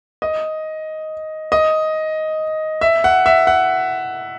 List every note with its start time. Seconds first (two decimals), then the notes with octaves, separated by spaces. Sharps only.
0.22 D#5
1.52 D#5
2.81 E5
3.04 F#5
3.26 E5
3.47 F#5